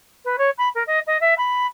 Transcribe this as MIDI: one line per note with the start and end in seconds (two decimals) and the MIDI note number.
0.25 0.36 71
0.38 0.50 73
0.58 0.69 83
0.75 0.83 70
0.87 1.00 75
1.07 1.20 75
1.21 1.34 76
1.38 1.67 83